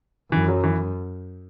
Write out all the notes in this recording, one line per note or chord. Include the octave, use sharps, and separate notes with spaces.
F#2 E3
F#3
E3